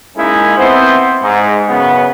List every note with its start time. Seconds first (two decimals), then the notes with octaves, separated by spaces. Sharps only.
0.16 G#3 A#3 C#4 D#4 E4
0.57 B3 C4 E4 C5
1.21 G#2
1.68 F#2 C#3 B3